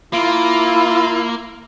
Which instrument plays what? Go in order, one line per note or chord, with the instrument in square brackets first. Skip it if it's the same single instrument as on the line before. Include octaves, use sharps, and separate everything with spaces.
[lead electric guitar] A#3 [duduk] E4 [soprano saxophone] F4